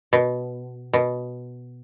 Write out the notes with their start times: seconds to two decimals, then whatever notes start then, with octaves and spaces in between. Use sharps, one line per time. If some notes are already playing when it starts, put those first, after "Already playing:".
0.13 B2
0.93 B2